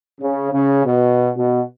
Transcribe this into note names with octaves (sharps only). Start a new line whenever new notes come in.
C#3
C#3
B2
B2